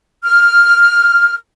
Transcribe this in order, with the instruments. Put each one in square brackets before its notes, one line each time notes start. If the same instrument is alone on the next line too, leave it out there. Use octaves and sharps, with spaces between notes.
[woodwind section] F6